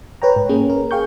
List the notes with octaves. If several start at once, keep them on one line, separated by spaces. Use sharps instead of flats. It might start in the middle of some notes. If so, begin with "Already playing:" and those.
B4 C#5 G5 A#5
G#2
A#3 C#4 G#4
A#4
G#4 F5 G5 C#6 G6